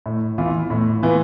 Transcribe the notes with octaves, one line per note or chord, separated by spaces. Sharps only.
A2
E3 B3 F4
A2
E3 B3 F4